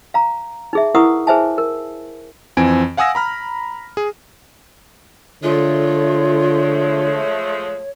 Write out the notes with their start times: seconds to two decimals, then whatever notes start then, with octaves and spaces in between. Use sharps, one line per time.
0.14 F5 A#5
0.73 D#4 G#4 E5
0.95 E4 A#4 B4 F#5 C#6 D#6
1.27 G#4 B4 C5 E5 G#5 A5
1.58 A#4
2.57 F2 E3 C4 G#5 D7
2.97 F5 F#5 G#5 D#6 E6 A#6
3.15 A#5 B5 F6
3.97 G#4
5.43 D3 F3 G#3 A3 F4 C#5